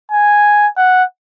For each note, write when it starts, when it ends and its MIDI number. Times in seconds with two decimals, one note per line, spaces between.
0.12 0.67 80
0.77 1.04 78